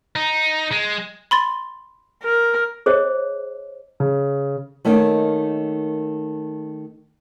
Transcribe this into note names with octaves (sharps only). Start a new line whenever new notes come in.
D#4
G#3
B5 C6 A6
A#4
G#4 C5 C#5 D#5
C#3
D#3 A3 A#3 C#4 D#4